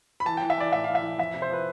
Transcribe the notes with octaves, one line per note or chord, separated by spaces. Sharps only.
B5
E3 A5
E3 G5
E5
E3 D5
A2 E5
E3 F5
E5
E3
F2 E5
C3
C5
F3 B4